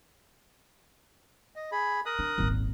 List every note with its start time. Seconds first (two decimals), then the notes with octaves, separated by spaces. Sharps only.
1.56 D#5
1.72 G#4 B5
2.06 A#4 D#6 F#6
2.19 D4
2.38 D#1 G#1